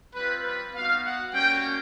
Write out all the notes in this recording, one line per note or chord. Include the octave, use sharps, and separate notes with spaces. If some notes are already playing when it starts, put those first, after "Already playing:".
G3 C4 F4 B4
B4
B3 D#4 F#4 F5
F#5
G3 A#3 C#4 F#4 G5